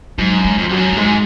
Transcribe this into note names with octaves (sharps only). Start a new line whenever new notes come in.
G#2 F#3
F#2
G#3
F2
F3
F2 F#3
F#2
F#3
G#2 G#3